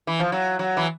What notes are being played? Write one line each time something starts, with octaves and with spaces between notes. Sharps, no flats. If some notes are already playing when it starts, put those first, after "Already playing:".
E3
F3
F#3
F#3
E3